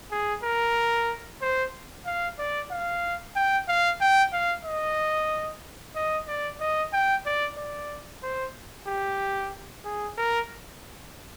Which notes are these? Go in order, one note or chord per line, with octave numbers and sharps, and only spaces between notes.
G#4
A#4
C5
F5
D5
F5
G5
F5
G5
F5
D#5
D#5
D5
D#5
G5
D5
D5
C5
G4
G#4
A#4